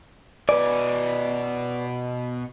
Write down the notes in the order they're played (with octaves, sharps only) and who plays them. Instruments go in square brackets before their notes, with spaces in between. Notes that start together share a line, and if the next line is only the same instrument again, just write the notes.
[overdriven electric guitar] B2 G#5 [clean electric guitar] B4 D5